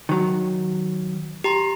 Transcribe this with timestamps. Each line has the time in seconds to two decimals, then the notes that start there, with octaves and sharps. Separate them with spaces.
0.09 D#3 F#3
1.44 G4 A#5 C6